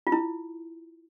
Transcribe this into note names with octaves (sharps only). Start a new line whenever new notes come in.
F4
E4